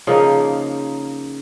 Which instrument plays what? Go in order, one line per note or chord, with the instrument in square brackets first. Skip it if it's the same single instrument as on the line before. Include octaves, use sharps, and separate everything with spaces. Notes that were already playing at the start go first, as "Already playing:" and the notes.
[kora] C#3 F3 A#3 D#4